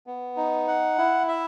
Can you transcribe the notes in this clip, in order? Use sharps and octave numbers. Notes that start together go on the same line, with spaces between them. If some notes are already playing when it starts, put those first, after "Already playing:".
B3
D#4
F#5
E4
E5